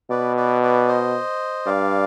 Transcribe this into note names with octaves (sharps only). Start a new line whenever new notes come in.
B2 B4 D5
B4 D5
B4 D5
C5 D#5
G2 D5 F5